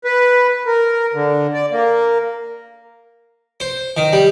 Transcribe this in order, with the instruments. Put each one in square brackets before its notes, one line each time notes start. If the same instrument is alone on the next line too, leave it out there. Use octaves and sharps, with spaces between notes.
[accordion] B4
A#4
D3
D5
A#3
[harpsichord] C5
D#3
G3